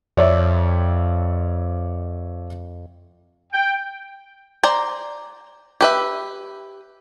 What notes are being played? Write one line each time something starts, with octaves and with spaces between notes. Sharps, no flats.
F2 C#5 D5 E5
G5
C5 D5 A#5
G4 B4 E5